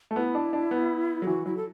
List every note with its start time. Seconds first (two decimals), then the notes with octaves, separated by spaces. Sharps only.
0.11 A3
0.16 B3 E4
0.35 D4
0.53 D4
0.71 B3
1.22 F#3 A4
1.27 E3 F#4
1.46 F#3 E4
1.57 A4